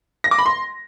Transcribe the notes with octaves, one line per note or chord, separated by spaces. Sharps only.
A#6
D6
B5
C6